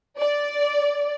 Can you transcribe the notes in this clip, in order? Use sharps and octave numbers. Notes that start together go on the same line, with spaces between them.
D5